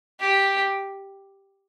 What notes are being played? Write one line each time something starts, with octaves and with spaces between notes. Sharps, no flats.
G4